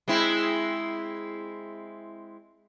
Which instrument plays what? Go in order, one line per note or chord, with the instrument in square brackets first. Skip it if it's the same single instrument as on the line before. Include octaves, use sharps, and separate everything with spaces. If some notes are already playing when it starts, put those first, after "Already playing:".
[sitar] G#3 C4 E4